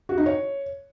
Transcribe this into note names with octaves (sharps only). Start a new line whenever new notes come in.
F#4
D#4
C#5